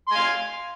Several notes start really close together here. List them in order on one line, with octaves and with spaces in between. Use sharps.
C6 G#5 F5